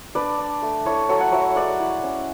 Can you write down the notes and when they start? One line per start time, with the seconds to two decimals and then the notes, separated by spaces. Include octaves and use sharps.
0.15 D4 B4 D5
0.39 D4
0.62 A3
0.86 E4 A4 C#5
1.09 F#3 A4 C#5
1.21 F#5
1.32 F#3 C#5 E5
1.56 G#3 D5 F#5
1.80 E4
2.03 C#4